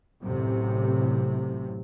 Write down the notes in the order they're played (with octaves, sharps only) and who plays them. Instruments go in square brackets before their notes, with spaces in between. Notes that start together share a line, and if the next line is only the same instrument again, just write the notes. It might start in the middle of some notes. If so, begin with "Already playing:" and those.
[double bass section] A1 F#2 C3